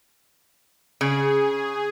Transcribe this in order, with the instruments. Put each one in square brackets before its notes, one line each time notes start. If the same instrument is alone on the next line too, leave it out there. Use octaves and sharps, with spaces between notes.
[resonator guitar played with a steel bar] C#3 [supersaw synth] G#4